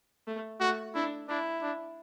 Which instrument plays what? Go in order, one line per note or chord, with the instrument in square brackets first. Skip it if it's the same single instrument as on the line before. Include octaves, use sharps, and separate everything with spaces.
[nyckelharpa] A3
[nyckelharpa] A3 [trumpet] F#4
[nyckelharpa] D4 [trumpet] E4
[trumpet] D4 [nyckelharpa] E4
[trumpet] D4